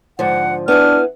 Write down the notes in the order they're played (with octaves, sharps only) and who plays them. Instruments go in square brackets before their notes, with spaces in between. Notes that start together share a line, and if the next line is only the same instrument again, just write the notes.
[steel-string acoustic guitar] G#2 D3 F3 [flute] F#5
[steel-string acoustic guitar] B3 E4 G#4 [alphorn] D4 [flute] F6